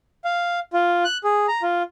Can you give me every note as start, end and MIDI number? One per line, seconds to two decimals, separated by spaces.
0.24 0.59 77
0.73 1.04 65
1.04 1.18 90
1.24 1.46 68
1.48 1.62 82
1.62 1.83 65